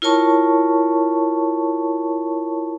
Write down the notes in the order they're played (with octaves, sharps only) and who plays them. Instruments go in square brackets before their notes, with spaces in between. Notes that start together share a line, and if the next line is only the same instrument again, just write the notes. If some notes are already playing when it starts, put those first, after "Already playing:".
[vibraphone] E4 F4 A#4 C#5 A5 C#6